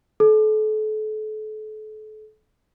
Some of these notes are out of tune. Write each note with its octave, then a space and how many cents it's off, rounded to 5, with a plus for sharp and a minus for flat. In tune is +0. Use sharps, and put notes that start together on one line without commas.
A4 -35